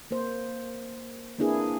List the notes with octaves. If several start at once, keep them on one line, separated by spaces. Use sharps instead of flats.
A#3 C5
A#3 C4 D4 E4 G#4 B4